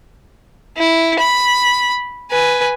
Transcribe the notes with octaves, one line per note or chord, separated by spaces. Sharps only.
E4
B5
B4 G#5